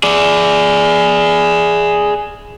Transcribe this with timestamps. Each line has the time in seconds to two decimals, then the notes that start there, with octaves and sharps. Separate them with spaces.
0.03 G#4 D5